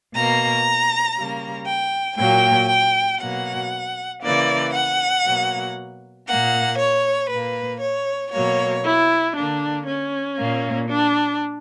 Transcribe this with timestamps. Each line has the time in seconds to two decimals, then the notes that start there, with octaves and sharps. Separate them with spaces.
0.14 B2 A#3 A#5
1.16 C#3 G3 A#3
1.67 G5
2.18 A#2 F#3 A#3 G5
2.69 G5
3.20 B2 F#3 A#3 F#5
4.23 C#3 E3 A#3 D5
4.74 F#5
5.25 B2 F#3 A#3
6.28 A#2 A#3 F#5
6.80 C#5
7.30 A#2 A#3 B4
7.81 C#5
8.32 B2 F#3 A#3 C#5
8.84 E4
9.35 D3 A#3 D4
9.87 C#4
10.38 A#2 A#3
10.89 D4